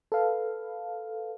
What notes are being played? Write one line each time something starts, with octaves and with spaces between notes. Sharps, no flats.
A4 B4 F5